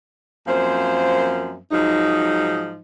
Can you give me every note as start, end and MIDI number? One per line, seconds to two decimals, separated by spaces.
0.47 1.57 42
0.47 1.57 53
0.47 1.57 58
0.47 1.57 60
0.47 1.57 72
0.47 1.57 77
1.71 2.79 44
1.71 2.79 53
1.71 2.79 54
1.71 2.79 63